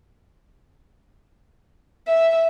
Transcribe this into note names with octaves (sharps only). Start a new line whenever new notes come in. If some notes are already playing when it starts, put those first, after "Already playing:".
E5